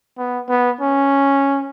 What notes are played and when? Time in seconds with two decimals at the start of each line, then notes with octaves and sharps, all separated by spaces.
0.18 B3
0.49 B3
0.81 C#4